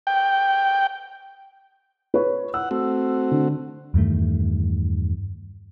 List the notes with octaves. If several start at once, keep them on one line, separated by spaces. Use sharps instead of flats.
G5
B4 C#5
F#5 E6
A3 C4 F#4
D3
E2 G2 D#3 A3